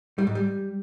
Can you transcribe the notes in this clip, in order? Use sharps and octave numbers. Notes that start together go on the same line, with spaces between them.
G3
G#2
G3